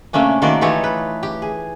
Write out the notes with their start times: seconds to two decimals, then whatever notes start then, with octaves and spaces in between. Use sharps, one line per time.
0.13 C3 A3 A#3 C#4 D4
0.42 D#3 A3 A#3 F#4 C5 D5
0.61 E3 D#4 F4 G4 A4 C#5
0.84 B4
1.23 G4
1.42 G#4